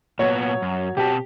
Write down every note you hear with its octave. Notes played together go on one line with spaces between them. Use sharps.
A#2 F#3 B3 C#5
F#2
B2 C4 G4 A5